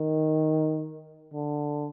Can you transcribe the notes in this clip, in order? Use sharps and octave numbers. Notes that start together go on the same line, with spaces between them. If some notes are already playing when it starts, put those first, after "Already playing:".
Already playing: D#3
D3